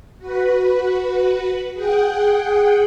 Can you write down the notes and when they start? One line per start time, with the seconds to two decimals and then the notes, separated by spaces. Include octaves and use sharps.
0.19 F#4 B4
1.74 G#4 F#5 G5